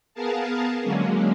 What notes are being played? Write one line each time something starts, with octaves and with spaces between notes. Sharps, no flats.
B3 G#4 A#4 F5 A5
D3 F#3 G#3 A#3 C#4